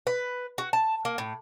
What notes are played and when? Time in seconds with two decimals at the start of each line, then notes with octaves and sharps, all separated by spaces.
0.07 B4
0.58 F#4
0.73 A5
1.05 A#3
1.18 A2